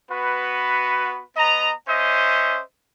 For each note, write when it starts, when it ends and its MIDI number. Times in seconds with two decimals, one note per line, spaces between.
0.11 1.22 59
0.11 1.22 66
0.11 1.22 71
1.37 1.73 59
1.37 1.73 75
1.37 1.73 82
1.88 2.61 61
1.88 2.61 72
1.88 2.61 75
1.88 2.61 76